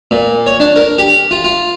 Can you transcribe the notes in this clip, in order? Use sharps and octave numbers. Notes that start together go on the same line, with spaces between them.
A#2
C#5
D4
A#4
G4
F4
F4